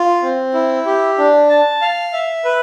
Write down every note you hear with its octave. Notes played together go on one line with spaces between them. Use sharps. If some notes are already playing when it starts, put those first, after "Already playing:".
Already playing: F4
C4
E4
G4
D4
A5
F5
E5
B4